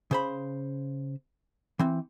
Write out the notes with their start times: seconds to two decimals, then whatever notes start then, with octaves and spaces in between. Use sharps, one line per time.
0.11 C#3 C5 B5
1.79 E3 C4